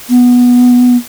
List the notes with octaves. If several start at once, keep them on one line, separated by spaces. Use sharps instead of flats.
B3